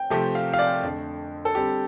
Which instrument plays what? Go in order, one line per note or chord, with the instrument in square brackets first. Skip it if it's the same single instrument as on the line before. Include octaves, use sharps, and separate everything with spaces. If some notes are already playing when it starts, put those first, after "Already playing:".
Already playing: [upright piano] G5
[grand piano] C3 F3 A3 C4 G4
[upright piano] F5
F5
D5
[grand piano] F2 D3 A3
[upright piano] A4
[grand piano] D3 G3 C4 [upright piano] G4